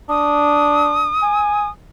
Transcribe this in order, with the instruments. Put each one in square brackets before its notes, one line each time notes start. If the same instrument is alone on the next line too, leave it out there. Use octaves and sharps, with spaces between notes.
[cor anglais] D4 [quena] D#6
[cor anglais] G#5